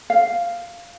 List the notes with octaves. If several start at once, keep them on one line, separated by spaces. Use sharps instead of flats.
F5